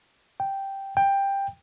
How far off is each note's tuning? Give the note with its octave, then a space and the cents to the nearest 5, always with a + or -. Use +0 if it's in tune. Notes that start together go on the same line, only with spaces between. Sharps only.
G5 -5
G5 +10